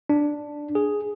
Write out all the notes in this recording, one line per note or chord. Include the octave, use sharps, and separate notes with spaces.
D4
G#4